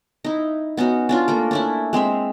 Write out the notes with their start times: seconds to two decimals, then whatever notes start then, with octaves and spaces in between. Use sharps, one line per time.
0.24 D#4 E4
0.77 B3 C#4 D#4 F#4
1.09 C#4 D4 F4
1.28 A3 A#3 A#4
1.51 C#4 D4 E4
1.93 G#3 C4 C5 E5